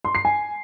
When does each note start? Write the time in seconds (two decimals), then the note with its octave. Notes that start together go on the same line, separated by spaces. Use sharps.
0.05 C6
0.15 C7
0.25 G#5